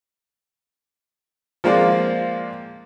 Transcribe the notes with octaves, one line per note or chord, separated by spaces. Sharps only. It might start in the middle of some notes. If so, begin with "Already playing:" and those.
F3 G#3 A#3 C4 D5